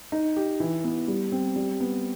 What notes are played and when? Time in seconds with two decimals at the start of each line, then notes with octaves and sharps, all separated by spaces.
0.12 D#4
0.36 G4
0.60 E3
0.84 B3
1.08 G3
1.32 C4
1.56 G3
1.80 B3